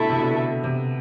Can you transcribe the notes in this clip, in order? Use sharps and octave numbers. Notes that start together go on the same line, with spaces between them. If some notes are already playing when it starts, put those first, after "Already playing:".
Already playing: B2 D3 A3 E4 A4 E5
C3
B2 D3
C3